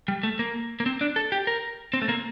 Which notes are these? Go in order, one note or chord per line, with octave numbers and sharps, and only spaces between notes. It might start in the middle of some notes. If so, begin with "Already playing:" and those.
G3
A3
A#3
A#3
C4
D4
A4
G4
A#4
C4
A3
A#3